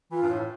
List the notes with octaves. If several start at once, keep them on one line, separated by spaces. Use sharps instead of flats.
E3 F4
G2
A2